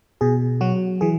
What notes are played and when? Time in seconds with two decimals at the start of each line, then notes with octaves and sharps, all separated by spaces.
0.21 B2 G#4
0.61 F#3 F#4
1.01 E3 G#4